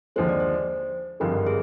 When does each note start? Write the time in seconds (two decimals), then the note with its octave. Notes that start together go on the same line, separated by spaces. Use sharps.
0.16 D#2 D3 F3 G#3 C5
0.29 D5
0.40 C5
1.20 G#1 G2 D3 F3 G#3 A#4
1.47 G#4